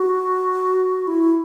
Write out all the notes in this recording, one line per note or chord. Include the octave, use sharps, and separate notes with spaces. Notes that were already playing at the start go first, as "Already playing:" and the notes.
Already playing: F#4
E4